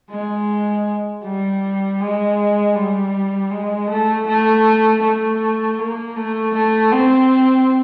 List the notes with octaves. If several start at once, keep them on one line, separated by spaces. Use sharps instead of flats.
G#3
G3
G#3
G3
G#3
A3
A3
A3
A#3
A3
A3
C4